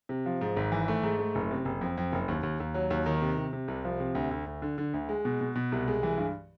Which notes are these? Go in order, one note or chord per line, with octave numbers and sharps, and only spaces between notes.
C3
F3
G#2
G#1
E3
A3
G#2
A3
F#1
C3
F#1
F2
F2
F#1
D#2
D#2
D#2
F#3
D#2
D#3
C3
C3
C3
C2
F3
C3
D2
D2
D2
D3
D3
D2
G#3
B2
B2
B2
C2
G#3
E3
G2